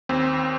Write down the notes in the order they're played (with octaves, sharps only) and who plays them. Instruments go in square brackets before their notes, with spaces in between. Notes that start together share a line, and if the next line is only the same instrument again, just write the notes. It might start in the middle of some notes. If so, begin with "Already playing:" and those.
[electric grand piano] D#2 C4